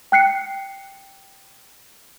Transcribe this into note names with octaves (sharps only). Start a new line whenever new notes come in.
G5 F#6 C7 C#7